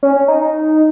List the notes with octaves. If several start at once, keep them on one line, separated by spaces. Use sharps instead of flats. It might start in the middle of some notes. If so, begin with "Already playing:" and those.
C#4
C#4
D#4
D#4